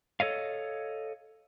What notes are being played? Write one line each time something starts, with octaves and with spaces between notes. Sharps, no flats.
A4 C#5 D#5 F5